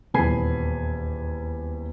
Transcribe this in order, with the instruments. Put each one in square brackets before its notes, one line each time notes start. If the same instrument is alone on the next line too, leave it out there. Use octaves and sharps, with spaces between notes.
[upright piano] D#1 E2 G#5 B5 C7